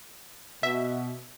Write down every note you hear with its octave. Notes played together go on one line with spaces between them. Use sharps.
B2 E5